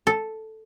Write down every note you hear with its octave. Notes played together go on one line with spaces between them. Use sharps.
A4